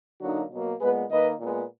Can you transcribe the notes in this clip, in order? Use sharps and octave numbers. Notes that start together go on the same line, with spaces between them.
D3 F#3 A#3 D#4 F#4
B2 F#3 A#3
A#2 G#3 B3 G#4 B4
D#3 A#3 B4 D#5
A#2 G#3 B3